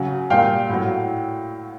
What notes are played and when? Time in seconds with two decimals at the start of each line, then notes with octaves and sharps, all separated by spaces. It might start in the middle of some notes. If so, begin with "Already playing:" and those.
Already playing: C#3 F#3
0.30 A#2 G3 F5 G5
0.69 A2 F#3